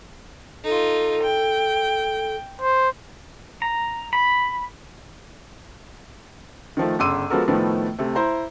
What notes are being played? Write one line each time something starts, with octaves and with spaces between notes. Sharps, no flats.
D#4 F4 A4
G5
C5
A#5
B5
D#3 F3 A3
G1 C#3 C6 D6 E6 D#7
F3 G#3 B3 F#4 A4 A#4
A2 D#3 F3 A3 B3
C3 A3
E4 C5 A#5